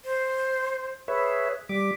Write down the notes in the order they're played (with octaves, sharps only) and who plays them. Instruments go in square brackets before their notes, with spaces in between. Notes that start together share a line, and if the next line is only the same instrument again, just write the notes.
[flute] C5
[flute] G#4 [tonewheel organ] B4 C#5 E5
[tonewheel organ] G3 D6 [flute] B6